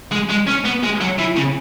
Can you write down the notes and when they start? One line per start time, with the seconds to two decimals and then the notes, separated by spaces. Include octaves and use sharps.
0.11 G#3
0.29 G#3
0.47 C#4
0.65 B3
0.83 G#3
1.01 F#3
1.19 E3
1.37 C#3